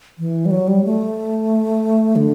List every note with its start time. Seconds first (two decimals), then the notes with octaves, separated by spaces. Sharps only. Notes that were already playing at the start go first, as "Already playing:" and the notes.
0.19 E3
0.46 G3
0.51 F#3
0.68 G3
0.85 A3
2.16 D3